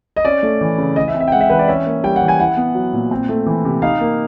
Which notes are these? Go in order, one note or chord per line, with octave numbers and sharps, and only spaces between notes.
D#5
C#4 D5
A3
E3
C#3
E3 D#5
E5
C4
E5
G5
G#3 F#5
E5
E3 B4
D5
C#4 E5
A#3
G3 G5
F#5
E3
G#5
E4 F#5
B3
F#3
A#2
C4
A3
E3
C3
D#4 F5
A#3